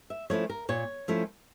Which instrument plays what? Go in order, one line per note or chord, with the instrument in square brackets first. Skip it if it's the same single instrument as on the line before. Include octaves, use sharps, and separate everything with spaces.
[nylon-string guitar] E5
F3 A3 C#4 E4 C#5
A#4
A#2 C#5
F3 A3 C#4 E4